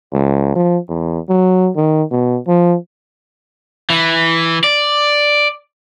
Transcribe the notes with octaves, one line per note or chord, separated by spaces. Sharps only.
C#2
F3
E2
F#3
D#3
B2
F3
E3
D5